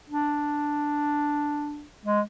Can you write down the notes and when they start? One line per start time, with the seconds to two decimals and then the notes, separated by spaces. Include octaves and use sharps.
0.10 D4
2.06 G#3